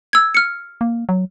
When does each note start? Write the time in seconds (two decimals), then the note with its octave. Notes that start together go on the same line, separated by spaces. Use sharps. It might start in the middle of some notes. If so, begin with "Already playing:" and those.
0.13 E6 G#6
0.35 F6 C#7
0.81 A#3
1.09 F#3